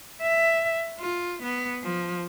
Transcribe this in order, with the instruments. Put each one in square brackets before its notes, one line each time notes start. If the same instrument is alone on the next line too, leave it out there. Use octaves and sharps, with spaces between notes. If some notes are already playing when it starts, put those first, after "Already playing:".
[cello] E5
F4
B3
F3